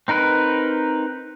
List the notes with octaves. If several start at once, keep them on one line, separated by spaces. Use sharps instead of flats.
C4 D#4 A#4 B4